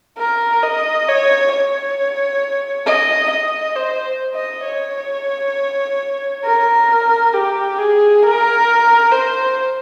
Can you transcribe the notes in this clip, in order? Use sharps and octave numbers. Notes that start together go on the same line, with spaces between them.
A#4
D#5
C#5
C#5
D#5
D#5
C5
D#5
C#5
A#4
G4
G#4
A#4
C5